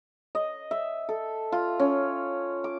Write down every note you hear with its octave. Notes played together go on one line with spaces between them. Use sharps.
D#5
E5
A4
F4
C#4
D6